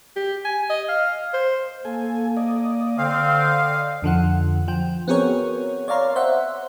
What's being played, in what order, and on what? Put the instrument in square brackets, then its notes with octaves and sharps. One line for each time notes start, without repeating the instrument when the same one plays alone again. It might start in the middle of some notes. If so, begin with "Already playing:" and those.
[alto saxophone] G4
G#5
D#5
F5
C5
[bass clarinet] A#3 [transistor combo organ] A4 G#5
[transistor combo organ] D5 D#5
[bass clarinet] D3 [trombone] C4 [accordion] F5
[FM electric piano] F2 D3 F3 F#5
F3 G5
B3 C4 F#4 G#4 A#4 C#5
C#5 D5 F5 A#5 C6
C5 E5 F#5